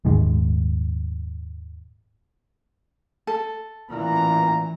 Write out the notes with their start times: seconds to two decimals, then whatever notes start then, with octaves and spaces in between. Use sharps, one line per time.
0.05 D#1 G#2 D#3 G#3
3.27 A4
3.90 A1 A#2 E3 A#5